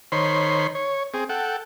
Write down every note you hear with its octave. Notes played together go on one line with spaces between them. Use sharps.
D#3 C5 C#5 B5 C6
C#5
C4 G#4
A4 F#5 G5